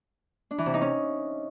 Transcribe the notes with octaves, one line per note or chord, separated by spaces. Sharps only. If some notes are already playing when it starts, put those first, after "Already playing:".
D4
E3
C3
D#4
C#4